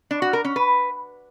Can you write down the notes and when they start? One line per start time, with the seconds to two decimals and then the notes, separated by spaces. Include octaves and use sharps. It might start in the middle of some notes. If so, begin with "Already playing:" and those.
0.11 D4
0.22 F#4
0.33 A#4
0.45 C#4
0.56 B4